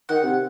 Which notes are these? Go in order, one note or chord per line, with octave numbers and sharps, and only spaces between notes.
D#3 F#5
C3